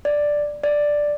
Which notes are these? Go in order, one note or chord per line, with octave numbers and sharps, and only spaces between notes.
D5
D5